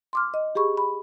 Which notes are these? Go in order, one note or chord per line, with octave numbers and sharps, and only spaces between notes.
C6 D6 F6
D#5
G4 G#4 B5 C#6
B5